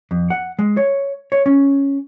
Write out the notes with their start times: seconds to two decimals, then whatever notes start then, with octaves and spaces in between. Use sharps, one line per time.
0.11 F2
0.30 F#5
0.59 G#3
0.77 C#5
1.32 C#5
1.46 C#4